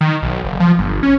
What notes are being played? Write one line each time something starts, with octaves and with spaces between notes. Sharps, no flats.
D#3
B1
F#1
F3
G1
C#4